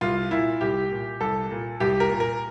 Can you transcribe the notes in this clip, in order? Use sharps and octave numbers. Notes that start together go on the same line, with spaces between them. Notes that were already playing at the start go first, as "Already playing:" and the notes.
C2 F4
A#2 E4
C2 G4
A#2
C2 A4
A#2
C2 G4
A#4
A#2
A#4